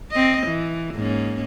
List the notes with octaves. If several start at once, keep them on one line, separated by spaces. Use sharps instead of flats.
C4 D#5
E3
G#2 A#3 C#4